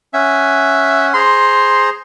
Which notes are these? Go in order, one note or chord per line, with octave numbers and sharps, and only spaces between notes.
C#4 E5 F#5 G#5
G#4 C5 A#5 C6